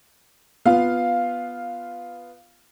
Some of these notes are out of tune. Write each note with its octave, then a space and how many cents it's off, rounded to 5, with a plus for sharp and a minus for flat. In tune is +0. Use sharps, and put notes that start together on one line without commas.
B3 +0 F4 +0 F5 +0